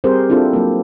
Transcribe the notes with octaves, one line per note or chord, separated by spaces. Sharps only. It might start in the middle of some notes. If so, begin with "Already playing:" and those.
G3 C4 G4 G#4 A#4 C5
C4 D4 E4 F4 A4
F#3 A#3